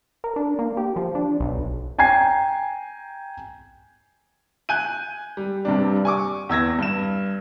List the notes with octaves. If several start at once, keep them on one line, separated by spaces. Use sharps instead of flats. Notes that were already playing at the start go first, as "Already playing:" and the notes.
A#4
D4
A#3
G4
F3
D4
B1
G5 G#5 A#5 G#6 C7
G#5 F#6 G6 D#7
G3
G2 C3 G3 D4
G#5 C#6 D6
E2 E6 G#6 A#6
G2 E7